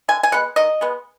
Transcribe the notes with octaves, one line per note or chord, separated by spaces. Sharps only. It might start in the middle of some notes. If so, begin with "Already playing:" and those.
D3 G#5
G#5
G#3 B3 F#5
D#3 D#5
G#3 B3